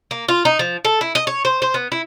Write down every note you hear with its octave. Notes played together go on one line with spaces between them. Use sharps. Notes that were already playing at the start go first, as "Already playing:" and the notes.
A#3
F4
D#4
F3
A4
E4
D#5
C#5
C5
C5
B3
E4